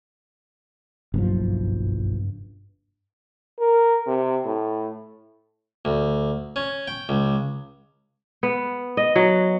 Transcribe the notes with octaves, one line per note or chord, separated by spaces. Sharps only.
F#1 B1 G2 F3
A#4
C3
A2
D2
C#4
G5
C#2
B3
D#5
F#3